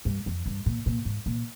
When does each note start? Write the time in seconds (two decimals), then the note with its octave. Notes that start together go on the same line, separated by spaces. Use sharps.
0.05 G2
0.26 F2
0.46 G2
0.66 A#2
0.86 A#2
1.05 G#2
1.26 A#2